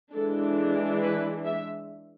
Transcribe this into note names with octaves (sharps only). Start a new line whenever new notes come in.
E3 G#3 D4 A4
B4
E5